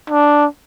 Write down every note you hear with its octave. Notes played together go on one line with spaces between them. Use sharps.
D4